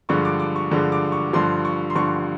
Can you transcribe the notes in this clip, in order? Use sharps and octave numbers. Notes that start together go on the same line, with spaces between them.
G2 D3 F3 G#3 C#6
D6
D6
C#6
G2 D3 F3 G#3
D6
C#6
G2 D3 F3 C6
C#6
C6
G2 D3 F3 C#6